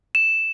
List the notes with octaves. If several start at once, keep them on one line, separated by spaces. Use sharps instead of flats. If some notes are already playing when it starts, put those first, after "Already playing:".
E7